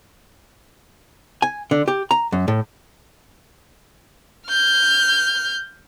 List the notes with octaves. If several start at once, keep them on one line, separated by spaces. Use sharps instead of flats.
G#5
D3
G4
A#5
F#2
A2
F6 G6